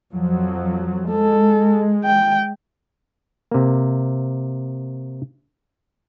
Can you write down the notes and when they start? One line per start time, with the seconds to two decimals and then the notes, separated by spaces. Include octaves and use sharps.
0.13 F2 F3 F#3
1.11 G#3 A4
2.04 G5
3.51 C3 A#3